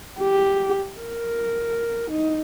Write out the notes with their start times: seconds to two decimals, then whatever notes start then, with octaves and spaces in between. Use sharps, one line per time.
0.21 G4
1.01 A#4
2.11 D#4